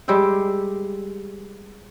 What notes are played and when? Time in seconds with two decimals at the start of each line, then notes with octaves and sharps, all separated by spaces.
0.08 G3 G#3 G4 E5